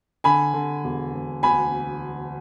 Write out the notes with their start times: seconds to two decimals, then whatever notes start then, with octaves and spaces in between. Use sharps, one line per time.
0.24 D3 G#5 B5
0.54 D3
0.84 E1
1.14 E1
1.43 D2 G#5 B5